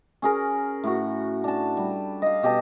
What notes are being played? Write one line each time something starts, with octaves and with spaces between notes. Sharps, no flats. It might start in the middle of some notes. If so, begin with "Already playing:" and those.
C#4 G#4 A#4
A2 F#4
D4 A5
G3
D#5 F5
B2 G4 D#5 A5